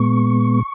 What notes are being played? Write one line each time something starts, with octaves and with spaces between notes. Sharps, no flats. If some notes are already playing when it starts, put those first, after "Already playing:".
Already playing: A#2 G#3 B3 C#6